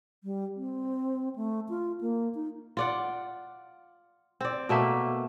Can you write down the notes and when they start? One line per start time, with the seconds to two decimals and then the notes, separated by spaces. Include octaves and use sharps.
0.24 G3
0.56 C4
1.36 A3
1.69 F4
2.01 A#3
2.35 D#4
2.77 F4 D5 F#5
4.41 C4 D5
4.69 B2 A3 A#3 E5